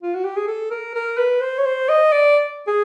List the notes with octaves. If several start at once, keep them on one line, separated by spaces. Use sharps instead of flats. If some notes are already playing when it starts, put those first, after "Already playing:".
F4
F#4
G4
G#4
A4
A#4
A#4
B4
C5
C#5
C5
D#5
D5
G#4